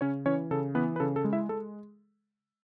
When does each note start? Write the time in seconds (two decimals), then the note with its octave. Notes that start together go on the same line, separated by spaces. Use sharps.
0.01 C#3 C#4 C#5
0.26 E3 C#4 C#5
0.51 C#3 A4
0.75 E3 B3 B4
0.96 B4
1.00 C#3 A4
1.16 A4
1.24 G#3
1.33 E4 E5
1.49 G#3 A4